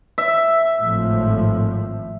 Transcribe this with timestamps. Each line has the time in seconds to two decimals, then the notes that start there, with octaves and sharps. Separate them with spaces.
0.18 E5
0.79 G#1 A2 F3